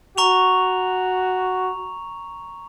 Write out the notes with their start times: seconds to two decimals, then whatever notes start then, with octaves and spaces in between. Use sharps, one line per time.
0.18 F#4 A#5 C#6 F7